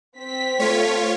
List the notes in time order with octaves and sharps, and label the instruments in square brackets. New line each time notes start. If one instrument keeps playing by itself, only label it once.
[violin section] C4 B6
[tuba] A3 [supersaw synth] F4 C#5